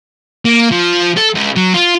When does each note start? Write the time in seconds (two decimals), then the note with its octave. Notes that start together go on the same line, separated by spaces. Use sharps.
0.45 A#3
0.72 F3
1.17 A4
1.35 C#2
1.56 F#3
1.74 F4